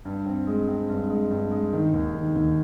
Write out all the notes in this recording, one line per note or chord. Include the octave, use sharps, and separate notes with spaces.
G2
C4
G#3
C4
G2
G#3
G2
G#3
D#3
D#2
D#3
D#2